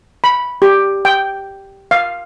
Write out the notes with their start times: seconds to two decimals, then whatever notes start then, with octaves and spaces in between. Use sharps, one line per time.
0.24 B5
0.62 G4
1.05 G5
1.91 F5